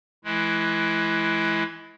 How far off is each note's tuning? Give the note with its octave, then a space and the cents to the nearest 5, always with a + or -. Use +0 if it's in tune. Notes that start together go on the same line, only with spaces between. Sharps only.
E3 +0 G#3 +30 E4 +10